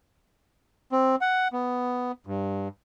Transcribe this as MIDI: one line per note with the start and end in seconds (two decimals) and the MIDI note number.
0.92 1.16 60
1.21 1.48 78
1.53 2.12 59
2.27 2.68 43